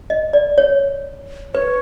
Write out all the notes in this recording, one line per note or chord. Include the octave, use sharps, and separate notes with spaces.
D#5
D5
C#5
B4 C#5